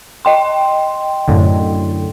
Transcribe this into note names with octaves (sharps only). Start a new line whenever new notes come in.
D#5 G5 C6
F#2 A2 D3